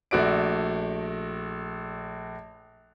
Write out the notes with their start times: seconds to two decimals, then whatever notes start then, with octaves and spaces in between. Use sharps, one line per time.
0.11 A#1 A3 F#4 D5 D7